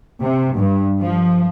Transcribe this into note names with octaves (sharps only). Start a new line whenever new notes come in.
C3
G2
F3